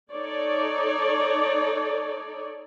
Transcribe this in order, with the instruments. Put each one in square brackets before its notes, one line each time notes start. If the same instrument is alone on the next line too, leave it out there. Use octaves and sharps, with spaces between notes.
[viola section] D#4 A4 C#5 D5